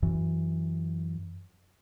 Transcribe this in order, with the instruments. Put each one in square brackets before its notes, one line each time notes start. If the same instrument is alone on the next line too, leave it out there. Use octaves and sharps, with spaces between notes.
[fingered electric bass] F#2 E3